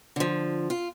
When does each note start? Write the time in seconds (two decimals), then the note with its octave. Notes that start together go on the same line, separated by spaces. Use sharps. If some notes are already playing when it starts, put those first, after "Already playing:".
0.16 D3 F3
0.70 F4